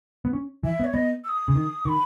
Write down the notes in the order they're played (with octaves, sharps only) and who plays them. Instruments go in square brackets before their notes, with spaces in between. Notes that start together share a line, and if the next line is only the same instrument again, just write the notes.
[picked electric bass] B3
C#4
[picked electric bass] E3 [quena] E5
[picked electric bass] B3
[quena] C#5
[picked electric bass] B3 [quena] D#5
[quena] E6
D#6
[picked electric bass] C#3
D#3
[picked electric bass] D#3 [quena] C#6
[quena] B5